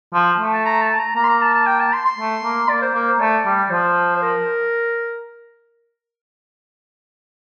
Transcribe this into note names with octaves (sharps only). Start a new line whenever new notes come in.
F3
A3
A5
A#5
A5
A#5
A#3 A#5
C6
A#5
A5
A5
G5
A5
C6
C6
A3
A#3
A#3 D5
C5
A#3
C5
A3 D5
G3
F3 C5
C5
A#4